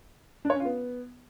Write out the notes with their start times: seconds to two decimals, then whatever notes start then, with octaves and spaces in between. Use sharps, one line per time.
0.45 D4
0.50 C#5
0.55 C#4
0.60 F4
0.65 B3